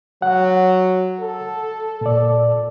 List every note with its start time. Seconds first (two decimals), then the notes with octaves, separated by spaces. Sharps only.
0.22 F#3 F#5
1.20 A4
2.01 A#2 D5